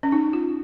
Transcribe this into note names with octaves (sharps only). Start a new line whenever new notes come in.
C#4
D#4
F4